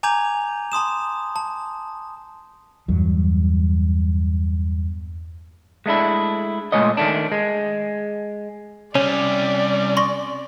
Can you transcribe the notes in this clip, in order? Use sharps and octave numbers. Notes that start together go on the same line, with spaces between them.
G#5 A#5 D6 G6 G#6 F7
A5 C6 D#6 E7
A5
E2 G2 F#3
G#3 A3 D4 E4
A#2 G#3 A3 C#5 D#5
D#3 A3 D4
G#3
C3 G3 C#4 C#5 D5
C6 C#6 A#6